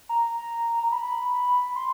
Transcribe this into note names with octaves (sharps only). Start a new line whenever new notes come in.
A#5
A#5
B5
C6